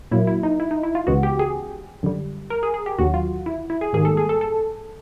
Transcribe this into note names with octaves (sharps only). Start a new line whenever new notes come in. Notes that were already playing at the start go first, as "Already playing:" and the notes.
A#2 F#3 A#3 E4
E4
D#4
E4
D#4
E4
F4
C#2 C#3 E3 G#3 B3 F#4
G4
G#4
F#2 D3 G3
A#4
G#4
G#4
G4
D#2 D3 F#3 F#4
F4
E4
E4
G#4
G#2 D#3 G3 A#3 G#4
A4
G#4
A4
A4